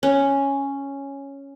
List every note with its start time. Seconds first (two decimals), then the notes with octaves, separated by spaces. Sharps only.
0.03 C#4